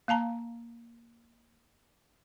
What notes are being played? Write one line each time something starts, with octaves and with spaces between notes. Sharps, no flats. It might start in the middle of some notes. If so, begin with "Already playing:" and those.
A#3 F5 A5 A#5